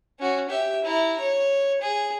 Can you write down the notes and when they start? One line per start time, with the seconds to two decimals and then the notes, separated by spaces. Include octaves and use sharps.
0.19 C#4 F#4
0.49 G4 E5
0.84 E4 A#5
1.20 C#5
1.81 G#4